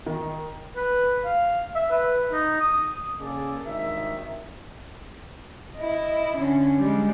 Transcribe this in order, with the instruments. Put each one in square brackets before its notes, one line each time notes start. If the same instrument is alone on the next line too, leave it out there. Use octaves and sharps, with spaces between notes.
[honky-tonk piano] D#3
[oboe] B4
F5
E5
B4
D#4
D#6
[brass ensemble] C#3 A#3 G#4 A4 D5
G#1 G2 D#3 E5
[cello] E4 D#5
D3 C#4
G3 G#3